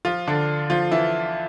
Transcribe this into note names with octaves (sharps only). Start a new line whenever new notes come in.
F3 F4
D3 D4
F3 F4
E3 E4